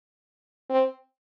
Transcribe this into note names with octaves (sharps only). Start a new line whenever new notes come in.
C4